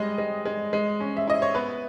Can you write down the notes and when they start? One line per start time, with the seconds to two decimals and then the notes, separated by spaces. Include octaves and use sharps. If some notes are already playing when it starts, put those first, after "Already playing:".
Already playing: G3 G#3 D#5
0.18 G#3
0.46 G#3
0.73 G#3
1.00 C#4
1.17 E5
1.27 E4 D#5
1.42 C#5
1.55 B3 B4